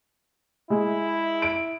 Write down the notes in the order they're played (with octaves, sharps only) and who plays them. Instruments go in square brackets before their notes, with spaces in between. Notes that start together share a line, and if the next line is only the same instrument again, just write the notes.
[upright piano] G#3 [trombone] E4
[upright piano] D7